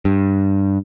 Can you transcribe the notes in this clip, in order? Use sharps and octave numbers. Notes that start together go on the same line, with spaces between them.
G2